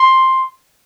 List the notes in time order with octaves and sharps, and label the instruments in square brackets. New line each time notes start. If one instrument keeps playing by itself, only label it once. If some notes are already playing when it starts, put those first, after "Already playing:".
Already playing: [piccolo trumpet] C6